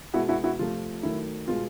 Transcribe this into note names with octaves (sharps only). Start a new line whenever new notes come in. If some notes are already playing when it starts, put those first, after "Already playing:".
B2 G#3 B3 E4 F#4
E4 F#4
E4 F#4
C3 F3 A3 F4
D#3 F#3 A3 E4
B2 G#3 B3 F4